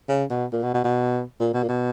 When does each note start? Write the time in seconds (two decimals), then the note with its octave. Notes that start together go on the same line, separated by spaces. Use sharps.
0.08 C#3
0.30 B2
0.52 A#2
0.63 B2
0.74 B2
0.84 B2
1.40 A#2
1.54 B2
1.63 A#2
1.68 B2